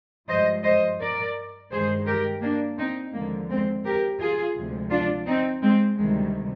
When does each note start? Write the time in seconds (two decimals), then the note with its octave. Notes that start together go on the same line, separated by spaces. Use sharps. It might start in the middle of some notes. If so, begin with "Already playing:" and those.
0.29 G2 F3 G#3 C5 D#5
0.64 C5 D#5
1.00 A#4 D5
1.71 G2 D#3 G#3 G#4 C5
2.07 G4 A#4
2.42 A#3 D4
2.78 C4 D#4
3.13 D#2 D3 F3 G#3 A#3
3.48 G#3 C4
3.85 G4 A#4
4.20 F4 G#4
4.56 D2 C3 F3 G#3
4.90 D4 F4
5.26 C4 D#4
5.62 G#3 C4
5.98 D2 C3 D#3 G3 G#3